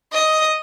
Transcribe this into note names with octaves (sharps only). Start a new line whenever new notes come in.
D#5